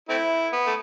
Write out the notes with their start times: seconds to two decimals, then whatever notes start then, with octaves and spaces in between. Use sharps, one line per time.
0.09 A3 C4 E4
0.52 B3
0.67 A3